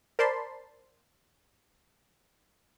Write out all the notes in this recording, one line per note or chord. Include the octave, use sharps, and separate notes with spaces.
A#4 C5 D5 A5 B5 C6